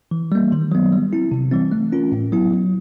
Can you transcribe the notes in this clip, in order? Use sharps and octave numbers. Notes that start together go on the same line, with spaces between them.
E3
G3 A#3
D#3
F#3 B3
G3
C4 E4
C3
E3 G3 C4
A3
C#4 F4 A#4
A2
F#3 B3 E4
F#3